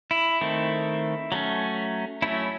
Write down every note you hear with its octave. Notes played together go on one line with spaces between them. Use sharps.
E4
D#3 A3 C4
F#3 A3 C#4
F#3 A3 C#4 E4